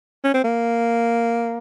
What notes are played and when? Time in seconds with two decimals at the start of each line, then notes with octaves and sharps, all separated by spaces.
0.24 C#4
0.34 C4
0.44 A#3